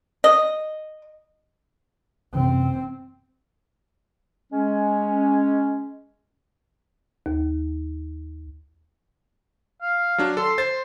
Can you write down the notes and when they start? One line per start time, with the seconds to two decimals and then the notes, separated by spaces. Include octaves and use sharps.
0.24 D#5
2.35 F#2 C3 E3 C4
4.52 G#3 C#4
7.26 D#2
9.82 F5
10.18 F#3 D4
10.37 A4 C6
10.58 C5 A6